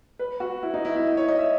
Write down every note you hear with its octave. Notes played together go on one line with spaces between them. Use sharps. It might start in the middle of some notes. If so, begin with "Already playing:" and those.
B4
F#4
E4
D#4
E4
E4
D#5
C#5
D#5
E5